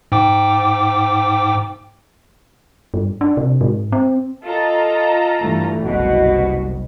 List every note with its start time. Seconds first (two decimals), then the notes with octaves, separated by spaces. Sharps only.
0.12 G#2 G5 D6
2.94 G2
3.21 D4
3.37 C3
3.61 G#2
3.92 C4
4.44 F4 A4 D#5 A#5
5.41 G2 E3 A3
5.84 F#1 C2 B2 F#4